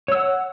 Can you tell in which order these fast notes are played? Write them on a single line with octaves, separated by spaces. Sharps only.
C#5 E6 F#5